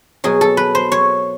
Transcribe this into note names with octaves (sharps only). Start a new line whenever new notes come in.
B2 F#3 G#4
A4
B4
C5
C#5